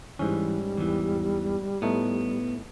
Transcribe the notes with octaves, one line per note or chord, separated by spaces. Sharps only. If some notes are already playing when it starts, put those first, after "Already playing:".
G#2 E3 G3 C#4
E2 E3
A2 A3 B3 D#4